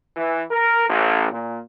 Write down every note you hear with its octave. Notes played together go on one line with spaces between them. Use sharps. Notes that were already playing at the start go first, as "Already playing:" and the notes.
E3
A#4
A1
A#2